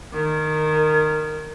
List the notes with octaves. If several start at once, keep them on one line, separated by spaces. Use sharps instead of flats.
D#3